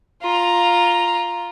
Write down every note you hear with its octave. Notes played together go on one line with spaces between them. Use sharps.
F4 A#5